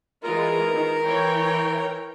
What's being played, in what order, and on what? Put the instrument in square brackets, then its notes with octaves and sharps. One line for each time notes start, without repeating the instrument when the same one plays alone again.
[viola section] E3 G#3 F4 [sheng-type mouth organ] A#4
[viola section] D#3
E3 C#5 G5